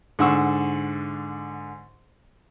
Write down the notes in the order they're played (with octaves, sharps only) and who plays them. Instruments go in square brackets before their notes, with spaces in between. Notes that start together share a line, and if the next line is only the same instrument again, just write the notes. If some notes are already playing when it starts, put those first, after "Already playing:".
[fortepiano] G#2 D3 F#5 C#6 E6